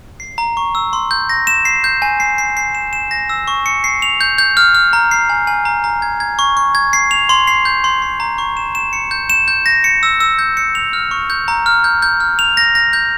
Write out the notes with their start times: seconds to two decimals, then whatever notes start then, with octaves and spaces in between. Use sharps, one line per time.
0.20 C7
0.38 A#5
0.57 C#6
0.75 E6
0.93 C6
1.11 G6
1.29 A#6
1.47 E7
1.65 C7
1.84 G6
2.02 G#5
2.20 C7
2.38 C7
2.57 C7
2.75 E7
2.93 E7
3.11 A#6
3.29 E6
3.48 C#6
3.66 C#7
3.84 C7
4.02 F7
4.21 G6
4.38 G6
4.57 F6
4.75 F6
4.93 A#5
5.11 C7
5.29 G#5
5.47 G#5
5.65 A#5
5.84 A#5
6.02 G#6
6.20 G#6
6.39 C#6
6.57 C#6
6.75 G#6
6.93 C7
7.11 F7
7.29 C6
7.47 C7
7.65 G6
7.84 C6
8.02 C6
8.20 A#5
8.38 C#6
8.57 E7
8.75 E7
8.93 C#7
9.11 G6
9.30 E7
9.48 G6
9.66 A#6
9.84 C#7
10.03 E6
10.20 E6
10.39 G6
10.57 C#7
10.75 F7
10.93 F6
11.11 C#6
11.30 G6
11.48 A#5
11.66 F6
11.84 G6
12.02 G6
12.20 F6
12.39 F7
12.57 A#6
12.75 A#6
12.93 G6